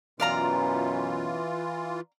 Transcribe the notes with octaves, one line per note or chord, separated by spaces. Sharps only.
F#2 B2 E3 C#4 F4 D5 F5 A#5